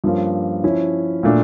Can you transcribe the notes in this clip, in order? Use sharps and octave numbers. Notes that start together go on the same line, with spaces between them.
G2 F3 A#3 C#4 F4
F3 C#4 E4
A#2 A3 D4 F4